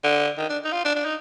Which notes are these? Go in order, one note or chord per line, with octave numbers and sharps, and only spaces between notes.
D3
D#3
D4
D#4
F4
D4
D4
D#4